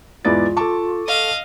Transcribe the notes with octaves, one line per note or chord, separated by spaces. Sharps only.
E2 G#2 E4 F4 B4 D5 A6
A4 A5 C#6 D6
D#5 F5